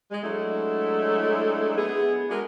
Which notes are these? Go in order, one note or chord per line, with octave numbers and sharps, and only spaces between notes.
G#3
F#3 G#3 A3 D4 E4
B3 G#4
G#3 A3 D4 F#4 A#4